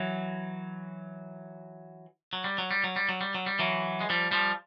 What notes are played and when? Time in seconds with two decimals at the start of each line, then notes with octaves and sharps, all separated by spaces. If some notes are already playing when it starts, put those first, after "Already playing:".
Already playing: E3 F#3
2.33 F#3
2.44 G3
2.58 F#3
2.71 G3
2.84 F#3
2.96 G3
3.09 F#3
3.21 G3
3.35 F#3
3.46 G3
3.59 E3 F#3
4.01 G#3
4.10 F3 G3
4.31 F3 G3